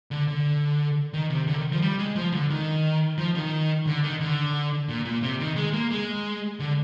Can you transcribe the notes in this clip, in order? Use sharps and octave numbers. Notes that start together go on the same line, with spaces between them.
D3
D3
D#3
C3
D3
D#3
F3
G3
G#3
F3
D3
D#3
F3
D#3
D3
D#3
D3
A#2
A#2
C3
D#3
G#3
A#3
G#3
D3